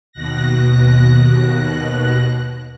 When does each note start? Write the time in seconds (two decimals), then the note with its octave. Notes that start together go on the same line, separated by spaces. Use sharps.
0.12 D#2 B2 F#6 A#6